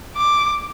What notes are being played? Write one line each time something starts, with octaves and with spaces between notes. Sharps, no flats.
D6